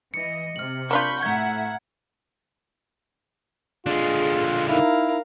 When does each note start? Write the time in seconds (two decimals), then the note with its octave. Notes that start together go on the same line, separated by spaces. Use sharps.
0.14 E3 D#5 C#7
0.56 C3 F6 F#7
0.91 A#3 D4 F4 B5 C#6 G6
1.23 A2 E5 F#5 A#5 G#6
3.87 D3 G#3 F4 G#4
4.68 D#4 E4 A#4 F5